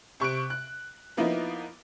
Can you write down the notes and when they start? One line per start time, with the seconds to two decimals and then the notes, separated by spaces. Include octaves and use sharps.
0.20 C3 C#6 F#6 D7
0.50 F#6
1.17 F3 A#3 B3 D#4 E4